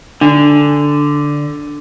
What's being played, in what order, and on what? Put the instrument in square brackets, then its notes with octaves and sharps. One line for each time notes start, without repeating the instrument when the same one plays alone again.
[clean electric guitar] D3 [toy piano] D4